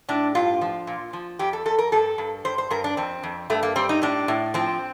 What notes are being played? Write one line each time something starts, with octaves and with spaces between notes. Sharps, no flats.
A2 D4
G2 F4
F3
A#2
F3
F2 G4
A4
F2 A4
A#4
G2 A4
G2
G2 C5
C5
G2 A#4
D4
F2 C4
F2
G2 A3
A#3
G3 C4
D#4
A2 D4
A2
F3 C4